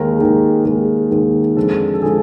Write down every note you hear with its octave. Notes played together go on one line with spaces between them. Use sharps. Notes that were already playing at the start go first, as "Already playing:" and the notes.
Already playing: D#2 D#3 G#3 A#4
D#2 D#3 G#3
D#2 D#3 G#3
D#2 D#3 G#3
F2 D3 F3 G#3 A4
A4
D3 F3 G#3 G#4